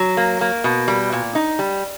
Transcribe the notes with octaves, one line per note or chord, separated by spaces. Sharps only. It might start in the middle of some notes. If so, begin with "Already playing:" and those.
Already playing: F#3
A#3
A#3
B2
G3
A#2
D#4
G3